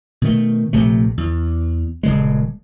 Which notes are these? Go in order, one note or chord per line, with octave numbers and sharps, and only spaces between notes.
B2 D#3 A3
A#1 C3 A3
E2
D#1 C#3 G#3